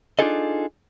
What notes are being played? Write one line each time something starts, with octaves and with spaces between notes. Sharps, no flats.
D4 D#4 F4 G#4 A4 D#5